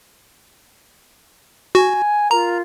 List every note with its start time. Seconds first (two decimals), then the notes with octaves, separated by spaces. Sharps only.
1.75 F#4 G#5
2.31 F4 A#4 A#5